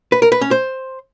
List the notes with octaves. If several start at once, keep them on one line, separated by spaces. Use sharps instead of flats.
B4
A#4
B4
C#4
C5